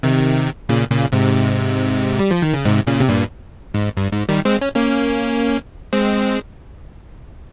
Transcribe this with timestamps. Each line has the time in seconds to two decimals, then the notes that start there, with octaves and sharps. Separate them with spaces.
0.03 C3 D#3
0.69 A#2 C#3
0.91 A#2 C#3
1.12 G#2 C3
2.19 G3
2.31 F3
2.42 D#3
2.54 C#3
2.65 G#2 C3
2.87 A#2 C#3
3.00 C3
3.09 G2 A#2
3.74 G#2
3.97 G2
4.12 G#2
4.29 D#3 G3
4.45 G#3 C4
4.61 C#4
4.76 A#3 C#4
5.93 G#3 C4